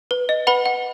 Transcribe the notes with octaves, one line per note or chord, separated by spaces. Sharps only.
B4
D#5
B4 F#5 B5
F#5